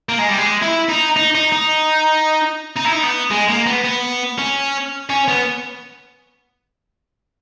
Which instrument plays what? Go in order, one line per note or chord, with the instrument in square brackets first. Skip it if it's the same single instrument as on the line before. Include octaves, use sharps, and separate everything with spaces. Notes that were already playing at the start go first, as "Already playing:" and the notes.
[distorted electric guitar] A#3
G#3
G3
G#3
E4
D#4
D#4
D#4
D#4
D#4
E4
D#4
B3
G#3
A#3
B3
B3
C#4
C#4
B3